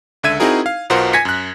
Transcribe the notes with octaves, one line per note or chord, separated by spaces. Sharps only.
C#2 D3 E5 G#6 D#7
C4 D#4 E4 F#4 G#4 A#4
F5
B1 B2 F4 A#4 C5 F#5
G#5 G#6 A#6 B6 C#7
F#2 F#6